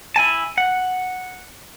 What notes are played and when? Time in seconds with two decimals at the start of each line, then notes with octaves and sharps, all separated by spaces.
0.16 E4 G#5 A5
0.58 F#5